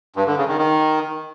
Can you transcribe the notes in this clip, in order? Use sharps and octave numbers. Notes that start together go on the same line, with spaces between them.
G2
D3
C#3
D#3
D#3